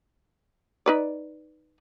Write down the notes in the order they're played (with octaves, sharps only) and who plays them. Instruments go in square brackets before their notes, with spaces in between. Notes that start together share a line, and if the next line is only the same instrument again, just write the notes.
[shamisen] D#4 B4 D5